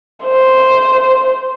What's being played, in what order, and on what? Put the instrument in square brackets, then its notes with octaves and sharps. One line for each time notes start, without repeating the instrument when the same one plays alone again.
[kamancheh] C5